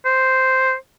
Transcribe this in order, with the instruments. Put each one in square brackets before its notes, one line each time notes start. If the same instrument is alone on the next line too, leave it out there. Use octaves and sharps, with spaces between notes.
[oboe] C5